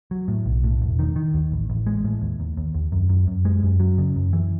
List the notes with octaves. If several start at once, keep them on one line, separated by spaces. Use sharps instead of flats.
F#3
A2
B1
A2
E1
D#3
D#3
D#2
A1
A1
G#3
A2
D#2
D#2
D#2
D#2
F#2
F#2
F#2
G#3
F#2
F#3
C#3
F#2
E3